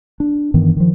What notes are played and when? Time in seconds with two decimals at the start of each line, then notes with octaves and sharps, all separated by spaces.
0.20 D4
0.54 G2 D#3 E3 B3
0.77 D#3 F3